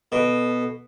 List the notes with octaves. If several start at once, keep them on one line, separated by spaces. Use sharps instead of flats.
B2 A4